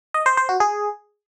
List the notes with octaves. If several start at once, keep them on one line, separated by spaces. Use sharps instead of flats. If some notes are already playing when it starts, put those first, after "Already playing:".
D#5
C5
C5
F#4
G#4